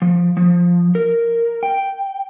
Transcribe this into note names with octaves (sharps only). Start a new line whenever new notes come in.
F3
F3
A#4
G5